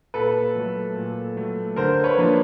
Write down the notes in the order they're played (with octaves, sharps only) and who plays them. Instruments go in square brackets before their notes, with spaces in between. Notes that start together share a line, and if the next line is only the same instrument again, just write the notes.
[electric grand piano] A#2 [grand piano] A4 B4
[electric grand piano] F#3 A3
A#2
F#3 A3
[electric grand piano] D3 [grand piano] A#4 C5
[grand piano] B4 C#5
[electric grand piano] F3 A#3 D4 F4